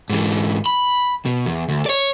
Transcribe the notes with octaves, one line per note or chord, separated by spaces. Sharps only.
G#2 E3
B5
B2
E2
D2
C#5 D5